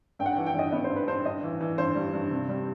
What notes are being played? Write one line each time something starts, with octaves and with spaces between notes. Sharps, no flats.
G2 G5
F#5
E3 G5
G5
G2 D#5
B3 D#5
C5
G2
B4
G2 C5
G2 D#5
E3
E3
G2 C5
G3
G2
C3
G3